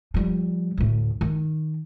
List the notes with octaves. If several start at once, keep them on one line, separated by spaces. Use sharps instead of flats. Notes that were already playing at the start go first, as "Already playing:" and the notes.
F3 G3
D2 A2
D#3